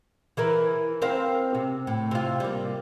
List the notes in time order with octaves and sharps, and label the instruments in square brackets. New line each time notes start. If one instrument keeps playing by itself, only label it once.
[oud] E3 E4 A#4
C4 A#4 F5
C3
A2
C3 F4
G3 A#3